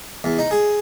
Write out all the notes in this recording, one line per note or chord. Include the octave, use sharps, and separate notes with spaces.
E2
D#4
G#4